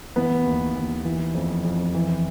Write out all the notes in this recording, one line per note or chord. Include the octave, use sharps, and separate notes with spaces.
E3 B3
D#2
D#2
E3
F2
F2
E3